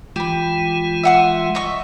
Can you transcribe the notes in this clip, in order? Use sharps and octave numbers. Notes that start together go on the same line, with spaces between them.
E3 G#3 F4 G4 B5
E5 F#5 C6
D#5 E5 C#6